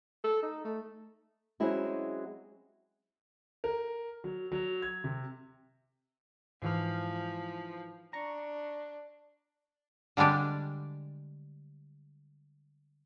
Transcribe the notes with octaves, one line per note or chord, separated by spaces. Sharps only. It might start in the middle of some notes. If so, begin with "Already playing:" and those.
A4
D#4
A3
F#3 G#3 C4 C#4 E4 F#4
A#4
F#3
F#3
G#6
C3
G#2 E3 F3 F6
D4 A#5 C#6
D3 G3 G#3 D4 G4